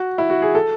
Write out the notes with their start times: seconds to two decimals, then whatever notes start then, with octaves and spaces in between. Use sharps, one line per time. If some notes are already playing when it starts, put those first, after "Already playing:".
Already playing: F#4
0.18 E4
0.30 F#4
0.42 G#4
0.55 A4